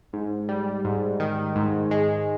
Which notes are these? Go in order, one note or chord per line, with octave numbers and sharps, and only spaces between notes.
G#2
G3
G#2
D#3
G#2
G#3